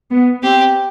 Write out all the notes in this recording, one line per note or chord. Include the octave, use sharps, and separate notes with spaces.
B3
C4 G4